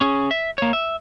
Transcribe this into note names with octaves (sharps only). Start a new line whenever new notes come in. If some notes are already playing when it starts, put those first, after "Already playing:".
C#4 G#4
E5
A#3 C#5
E5